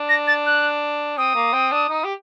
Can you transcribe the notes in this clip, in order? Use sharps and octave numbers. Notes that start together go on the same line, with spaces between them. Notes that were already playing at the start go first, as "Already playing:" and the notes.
Already playing: D4
A#6
A6
F#6
C4 D#6
A#3
C4
D4
D#4
G4